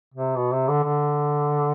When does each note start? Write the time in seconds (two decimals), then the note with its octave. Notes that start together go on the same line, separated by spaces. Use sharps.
0.14 C3
0.36 B2
0.52 C3
0.68 D3
0.84 D3